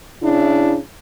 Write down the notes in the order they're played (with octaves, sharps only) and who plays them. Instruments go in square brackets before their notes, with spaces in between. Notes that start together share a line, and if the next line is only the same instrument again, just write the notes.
[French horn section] C#3 D4 E4